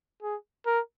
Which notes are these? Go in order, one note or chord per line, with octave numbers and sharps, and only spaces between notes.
G#4
A#4